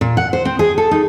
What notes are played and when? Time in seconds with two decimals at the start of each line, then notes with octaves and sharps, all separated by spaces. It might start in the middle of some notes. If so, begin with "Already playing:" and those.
0.01 A#2
0.17 F#5
0.33 C5
0.45 C4
0.59 G#4
0.78 A4
0.91 D#4